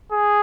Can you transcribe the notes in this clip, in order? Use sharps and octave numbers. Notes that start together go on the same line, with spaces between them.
G#4